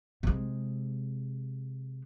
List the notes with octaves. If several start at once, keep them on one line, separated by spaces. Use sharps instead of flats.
C3 G#3